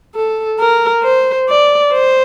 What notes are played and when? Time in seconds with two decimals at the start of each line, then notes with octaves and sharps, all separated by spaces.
0.15 A4
0.60 A#4
1.04 C5
1.49 D5
1.93 C5